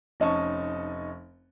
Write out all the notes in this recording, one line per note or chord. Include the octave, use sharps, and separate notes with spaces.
F1 C#4 D#4 D#5 A5 C#6